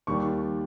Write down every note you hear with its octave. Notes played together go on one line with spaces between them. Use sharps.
D#2 D#3 G3 C#6